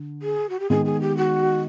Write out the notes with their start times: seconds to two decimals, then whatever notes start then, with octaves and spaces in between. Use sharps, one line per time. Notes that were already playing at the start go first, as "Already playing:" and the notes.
Already playing: D3
0.22 G#4
0.49 F#4
0.59 G4
0.70 D#3 G#3 B3 G#4
0.85 G#4
1.01 G4
1.17 F#4